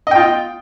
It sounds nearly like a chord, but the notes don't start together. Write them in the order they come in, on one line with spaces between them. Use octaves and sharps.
D#5 G5 F4